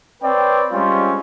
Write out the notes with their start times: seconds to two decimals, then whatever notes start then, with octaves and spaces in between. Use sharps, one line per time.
0.23 C4 B4 C#5 D5 G5
0.72 G3 G#3 C4 C#4 F4